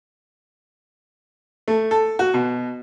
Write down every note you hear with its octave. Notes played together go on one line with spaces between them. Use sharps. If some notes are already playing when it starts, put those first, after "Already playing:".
A3
A4
F#4
B2